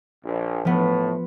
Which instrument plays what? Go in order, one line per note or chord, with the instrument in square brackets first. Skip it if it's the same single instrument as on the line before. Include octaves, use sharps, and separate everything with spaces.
[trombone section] A#1
[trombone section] A2 [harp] F3 B3